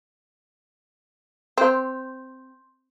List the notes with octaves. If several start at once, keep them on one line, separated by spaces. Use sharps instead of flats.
C4 C6 G6